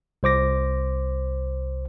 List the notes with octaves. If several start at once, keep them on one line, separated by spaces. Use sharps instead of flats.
C2 C5 D6 A#6